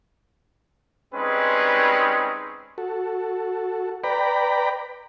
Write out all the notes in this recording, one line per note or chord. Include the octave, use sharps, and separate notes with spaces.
G3 G#3 C4 C#4 D#4 B4
F#4 A4
B4 D5 G5 A#5 B5